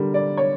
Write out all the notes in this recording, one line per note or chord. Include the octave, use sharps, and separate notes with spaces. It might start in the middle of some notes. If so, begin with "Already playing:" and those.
Already playing: D3 G3 A#4
D5
C#5